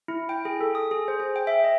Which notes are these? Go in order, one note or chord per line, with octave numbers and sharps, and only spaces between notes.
E4
G5
G#4
A4
D#6
G#4
C5
G#4
G5
E5
D#5